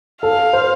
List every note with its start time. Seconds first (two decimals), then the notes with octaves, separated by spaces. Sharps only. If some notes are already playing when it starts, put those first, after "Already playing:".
0.22 A4 F5
0.53 C5